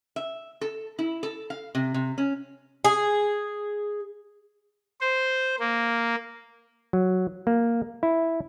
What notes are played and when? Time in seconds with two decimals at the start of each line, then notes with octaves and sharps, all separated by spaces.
0.16 E5
0.61 A4
0.99 E4
1.23 A4
1.50 F5
1.75 C3
1.94 C3
2.18 C#4
2.84 G#4
5.01 C5
5.59 A#3
6.93 F#3
7.47 A#3
8.03 E4